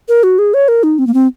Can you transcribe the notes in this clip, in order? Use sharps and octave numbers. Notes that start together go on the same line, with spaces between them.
A#4
F#4
G#4
C#5
A#4
D#4
C4
A#3
C4